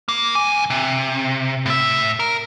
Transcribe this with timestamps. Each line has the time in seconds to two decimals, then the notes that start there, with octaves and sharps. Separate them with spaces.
0.09 A#3
0.35 C2 G#5
0.70 C3
1.66 A2 E5
2.20 A#4